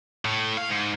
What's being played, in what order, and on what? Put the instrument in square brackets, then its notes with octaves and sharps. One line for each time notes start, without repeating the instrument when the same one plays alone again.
[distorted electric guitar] A2
F5
G#2